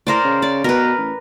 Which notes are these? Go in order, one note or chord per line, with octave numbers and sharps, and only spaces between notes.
A2 A#4 C5 D5
C#3
D5
B2 A#4 B4
A1